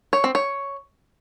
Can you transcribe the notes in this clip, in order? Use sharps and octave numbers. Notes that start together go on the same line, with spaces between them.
C#5
C4
C#5